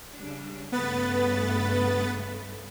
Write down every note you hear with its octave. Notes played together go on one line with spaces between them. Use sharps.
C#3 G3 D4
G2 C#3 A3 B3 B4 A6